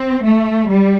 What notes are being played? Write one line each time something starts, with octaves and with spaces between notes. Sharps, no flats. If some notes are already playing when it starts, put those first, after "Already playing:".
Already playing: C4
A3
G3